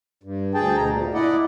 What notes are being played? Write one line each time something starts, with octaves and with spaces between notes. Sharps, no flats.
G2
D2 G#4 G5 A5
D2 B2 A#5
A#2
E4 D5 D#5 F#5